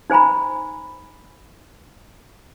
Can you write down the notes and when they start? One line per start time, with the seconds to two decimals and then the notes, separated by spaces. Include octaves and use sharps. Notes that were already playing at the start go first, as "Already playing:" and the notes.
0.10 D#4 C5 G#5 A#5 B5